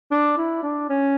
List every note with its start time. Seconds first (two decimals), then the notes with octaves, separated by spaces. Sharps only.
0.11 D4
0.37 E4
0.63 D4
0.89 C#4